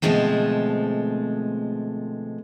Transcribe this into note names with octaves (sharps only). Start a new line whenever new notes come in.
B2 D3 F3 G#3 A3 C4